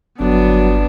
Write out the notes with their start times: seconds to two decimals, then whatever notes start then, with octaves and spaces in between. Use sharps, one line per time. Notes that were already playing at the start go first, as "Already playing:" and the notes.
0.20 G1 F#3 B3 D4